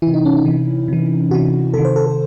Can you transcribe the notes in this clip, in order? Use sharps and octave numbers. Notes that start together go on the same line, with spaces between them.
C3 E3 E4
D#4
C#4
D#4
C3 E3
C3 E3
C3 E3 F#4
C3 D#3 A4
C5
A4
A4